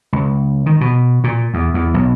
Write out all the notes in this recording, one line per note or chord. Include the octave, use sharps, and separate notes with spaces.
C#2
D#3
B2
A#2
E2
E2
B1